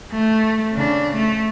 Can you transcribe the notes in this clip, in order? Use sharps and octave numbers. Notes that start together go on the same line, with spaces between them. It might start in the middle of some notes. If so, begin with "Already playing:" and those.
A3
C#3 D4
A3